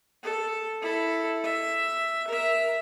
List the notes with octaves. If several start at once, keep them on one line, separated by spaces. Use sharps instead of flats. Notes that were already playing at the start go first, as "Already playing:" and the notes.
A4
E4 A4
E5
A#4 E5